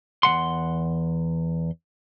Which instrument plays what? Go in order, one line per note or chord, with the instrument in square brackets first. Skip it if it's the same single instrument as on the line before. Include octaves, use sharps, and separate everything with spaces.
[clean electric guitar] E2 F#3 F#5 C6